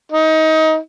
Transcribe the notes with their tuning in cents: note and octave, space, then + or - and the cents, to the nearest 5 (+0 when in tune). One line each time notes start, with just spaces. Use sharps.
D#4 +25